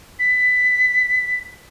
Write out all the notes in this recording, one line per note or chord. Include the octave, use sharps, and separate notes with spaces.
B6